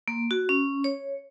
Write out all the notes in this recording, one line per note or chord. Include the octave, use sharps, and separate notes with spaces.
A#3
F#4
C#4
C#5